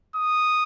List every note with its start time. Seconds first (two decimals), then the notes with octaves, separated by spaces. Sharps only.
0.15 D#6